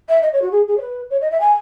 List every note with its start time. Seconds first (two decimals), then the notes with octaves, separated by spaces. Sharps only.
0.09 E5
0.22 D#5
0.33 C#5
0.42 F#4
0.52 G#4
0.68 G#4
0.77 C#5
0.81 B4
1.10 C#5
1.21 D#5
1.31 E5
1.40 G#5